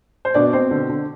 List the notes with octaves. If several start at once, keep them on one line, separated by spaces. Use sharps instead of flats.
C5
B2 D4 D5
B2 C4 C5
D3
D3